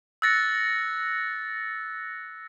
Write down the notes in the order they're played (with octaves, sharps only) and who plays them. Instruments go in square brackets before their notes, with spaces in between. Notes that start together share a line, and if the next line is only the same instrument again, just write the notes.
[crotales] E6 F#6 A6 A#6 C#7